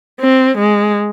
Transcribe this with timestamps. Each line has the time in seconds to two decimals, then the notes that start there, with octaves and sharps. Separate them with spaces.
0.20 C4
0.58 G#3